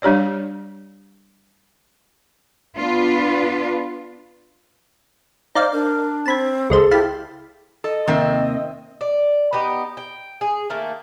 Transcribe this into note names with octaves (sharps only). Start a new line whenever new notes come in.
G3 D4 G4 C#5 D5
B3 D4 F4 B4
D#4 C5 D5 F5
D4 A#4
C4 A5 B5 G#6
C#2 G#3 G#4 A4 C5
E4 G4 F5 A5 B5
A4 D#5
D#2 C3 D#3 A#3 C4 E5
D5
B3 D#4 G4
G5
G#4
D#3 A3 A#3